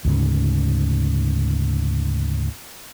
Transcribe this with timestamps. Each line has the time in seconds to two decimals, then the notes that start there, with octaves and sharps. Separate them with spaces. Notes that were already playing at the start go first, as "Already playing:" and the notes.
0.05 D2 G#2 C#3